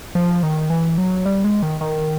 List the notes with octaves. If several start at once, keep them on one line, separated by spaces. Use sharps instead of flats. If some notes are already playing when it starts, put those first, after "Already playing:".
F3
D#3
E3
F#3
G3
G#3
D#3
D#3